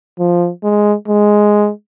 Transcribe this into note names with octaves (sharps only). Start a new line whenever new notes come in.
F3
G#3
G#3